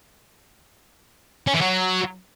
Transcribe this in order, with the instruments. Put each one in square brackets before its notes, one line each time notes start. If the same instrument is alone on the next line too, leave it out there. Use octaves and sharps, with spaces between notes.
[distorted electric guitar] C#4
E3
F#3